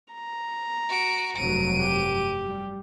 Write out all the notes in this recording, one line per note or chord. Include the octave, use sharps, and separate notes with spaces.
A#5
F#4 D7
F1 G2 F#3 D7 D#7
G4
G3